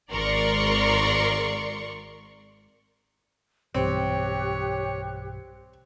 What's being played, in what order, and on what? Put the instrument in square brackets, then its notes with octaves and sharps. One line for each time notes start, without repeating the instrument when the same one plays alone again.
[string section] G#1 G#2 A#4 D5 C6 C#6
[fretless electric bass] B1 G2 E3 [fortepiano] C4 [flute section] G4 F#6 [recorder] C#5